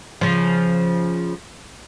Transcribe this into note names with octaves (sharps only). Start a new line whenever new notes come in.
C#3 F3